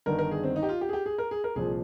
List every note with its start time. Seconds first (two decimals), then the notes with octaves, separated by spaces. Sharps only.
0.06 G1 G2 D#3 A#4
0.19 A#4
0.31 G#4
0.43 C4
0.56 D#4
0.63 G4
0.69 F4
0.81 G4
0.89 G#4
0.93 G4
1.06 G#4
1.18 A#4
1.31 G#4
1.44 A#4
1.55 C2 A#2 F3 G#4